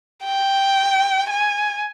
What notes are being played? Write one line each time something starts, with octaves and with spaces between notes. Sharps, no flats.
G5
G#5